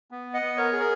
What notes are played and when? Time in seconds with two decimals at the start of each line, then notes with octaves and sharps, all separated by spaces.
0.11 B3
0.34 D#5 F#5
0.42 B3
0.57 A#4 C#5
0.72 G#4
0.80 A#4